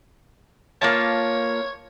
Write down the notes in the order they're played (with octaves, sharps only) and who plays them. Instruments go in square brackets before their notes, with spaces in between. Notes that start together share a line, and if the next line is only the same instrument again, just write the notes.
[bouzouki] A#3 F4 A5 [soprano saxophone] C#5